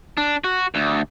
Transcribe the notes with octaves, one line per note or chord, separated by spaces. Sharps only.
D4
F#4
D2